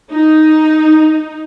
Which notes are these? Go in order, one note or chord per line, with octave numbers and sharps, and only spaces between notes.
D#4